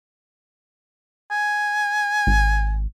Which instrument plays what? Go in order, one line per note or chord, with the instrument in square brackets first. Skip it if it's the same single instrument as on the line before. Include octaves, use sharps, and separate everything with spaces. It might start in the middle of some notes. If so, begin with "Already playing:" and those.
[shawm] G#5
[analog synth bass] G#1